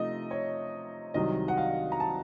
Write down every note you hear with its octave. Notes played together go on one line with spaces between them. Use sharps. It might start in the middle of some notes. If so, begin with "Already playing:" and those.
Already playing: C3 F3 A3 D#4 D#5
C#5
C2 C3 D#3 F#3 D#5
F#5
F5
A#5
A5